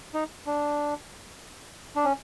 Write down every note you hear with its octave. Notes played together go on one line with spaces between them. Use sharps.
D#4
D4
D4
C#4